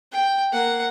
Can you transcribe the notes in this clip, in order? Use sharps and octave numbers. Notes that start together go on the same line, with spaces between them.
G5
A#3 F#5